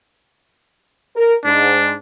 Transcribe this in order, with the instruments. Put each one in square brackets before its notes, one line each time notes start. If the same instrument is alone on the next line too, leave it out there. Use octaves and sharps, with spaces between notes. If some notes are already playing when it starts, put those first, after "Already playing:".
[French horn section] A#4
[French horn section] G#2 [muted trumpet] D4